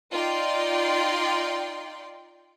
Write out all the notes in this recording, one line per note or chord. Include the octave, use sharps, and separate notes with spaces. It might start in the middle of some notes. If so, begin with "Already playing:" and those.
D#4 F4 D5 G5 C6